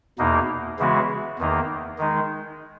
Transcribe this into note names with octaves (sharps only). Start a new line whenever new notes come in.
E2 B2 A#3 D#4
C#3 E3 G#3 B3 F#4
E2 D#3 A#3 D#4
D#3 G#3 D#4